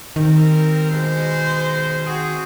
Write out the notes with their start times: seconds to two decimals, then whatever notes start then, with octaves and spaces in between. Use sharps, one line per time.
0.16 D#3 G3 C4 A#4
0.91 B2 G#3 C5
2.06 C4 F#4 G#4